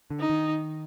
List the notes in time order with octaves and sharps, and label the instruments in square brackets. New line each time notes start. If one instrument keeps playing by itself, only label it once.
[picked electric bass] D3
[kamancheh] D#4
[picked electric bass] D#3